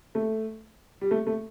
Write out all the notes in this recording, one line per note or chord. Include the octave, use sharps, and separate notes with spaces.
A3
G3
A3
A3